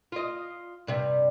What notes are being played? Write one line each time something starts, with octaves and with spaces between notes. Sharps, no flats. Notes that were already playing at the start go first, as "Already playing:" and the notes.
F4 D#5
G2 C3 G3